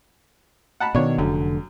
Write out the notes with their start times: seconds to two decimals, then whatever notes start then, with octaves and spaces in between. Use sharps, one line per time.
0.80 F#5 A5 B5
0.95 B2 D#3 D4 C#5
1.18 F1 F#2 D3